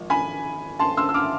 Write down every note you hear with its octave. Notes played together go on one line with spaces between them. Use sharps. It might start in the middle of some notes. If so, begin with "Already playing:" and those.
Already playing: G#1 F3
G#5 B5
A5 C6
C6 E6
E6
D6 F6